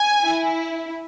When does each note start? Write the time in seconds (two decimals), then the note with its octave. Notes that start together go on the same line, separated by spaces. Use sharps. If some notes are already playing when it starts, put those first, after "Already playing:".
Already playing: G#5
0.24 E4